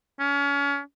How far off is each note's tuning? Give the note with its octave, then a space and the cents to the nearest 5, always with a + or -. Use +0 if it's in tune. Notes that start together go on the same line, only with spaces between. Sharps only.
C#4 +30